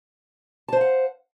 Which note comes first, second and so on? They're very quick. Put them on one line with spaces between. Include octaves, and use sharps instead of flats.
A5 C5 F5 F#5